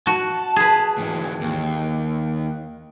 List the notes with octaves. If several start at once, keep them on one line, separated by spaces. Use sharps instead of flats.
F#4 A5
G#4 B4
G#2 E3
D#2